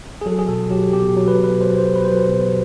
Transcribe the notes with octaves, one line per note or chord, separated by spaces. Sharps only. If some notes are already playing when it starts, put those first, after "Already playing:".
G#4
F#3 A4
G#4
B2 A4
F#3 G4
B2 G4
F#3
B4
B2 B4
F#3 C5
B2 C5
B4
F#3 C5
B4
B2